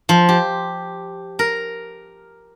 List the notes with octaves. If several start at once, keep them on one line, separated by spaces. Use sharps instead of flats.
F3
G4
A#4